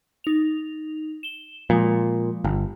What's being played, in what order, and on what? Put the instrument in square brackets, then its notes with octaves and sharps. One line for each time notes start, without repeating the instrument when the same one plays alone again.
[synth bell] D#4 F7
E7 G7
[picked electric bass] A#2 [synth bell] F3 G#3
[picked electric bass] G1